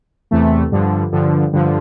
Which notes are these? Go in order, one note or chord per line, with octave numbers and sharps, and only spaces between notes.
E2 C3 E3 A3
G2 D3 F3
G2 D3 F3
G2 D3 F3